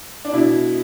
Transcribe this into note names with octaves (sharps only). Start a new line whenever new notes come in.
D4
B2 E4